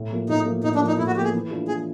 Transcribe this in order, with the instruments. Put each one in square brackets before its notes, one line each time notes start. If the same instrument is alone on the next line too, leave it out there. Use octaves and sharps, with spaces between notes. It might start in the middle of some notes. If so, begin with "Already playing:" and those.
Already playing: [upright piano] A2
F3 A#3
[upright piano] A2 [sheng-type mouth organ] D#4
[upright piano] F3 A#3
[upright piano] A2 [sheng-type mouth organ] D#4
[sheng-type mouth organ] D4
[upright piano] F3 A#3
[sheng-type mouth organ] D#4
[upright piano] A2 [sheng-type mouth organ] E4
[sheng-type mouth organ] F#4
[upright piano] F3 A#3 [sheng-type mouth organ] G4
[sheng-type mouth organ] G#4
[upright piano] E3
A3 D4 F4
[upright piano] E3 [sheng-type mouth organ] G#4